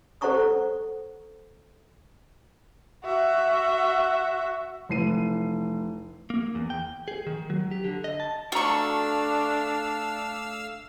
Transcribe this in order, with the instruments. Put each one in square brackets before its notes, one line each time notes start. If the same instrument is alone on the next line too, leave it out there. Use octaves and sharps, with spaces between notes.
[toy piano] A4 C5 F#5 A#5 C#6 D#6
[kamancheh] F#4 E5
[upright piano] F1 E3 C7 D#7
[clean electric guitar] A#3
E2
G5
G#4
D#3
F#3
G4
D3
D#5
A5
[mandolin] A3 C#6 [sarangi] D4 [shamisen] F#4 A#5 [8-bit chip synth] F5 E6